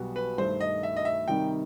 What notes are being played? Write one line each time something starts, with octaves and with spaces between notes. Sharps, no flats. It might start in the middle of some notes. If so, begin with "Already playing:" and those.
Already playing: B1 B2 G3 B3 F#4
B4
G2 D#3 A3 C5
D#5
E5
D#5
E5
C3 D#3 G3 D#4 G5